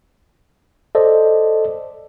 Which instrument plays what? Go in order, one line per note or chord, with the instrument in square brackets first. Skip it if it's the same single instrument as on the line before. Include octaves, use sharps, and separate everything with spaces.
[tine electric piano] A4 C5 D5 D#5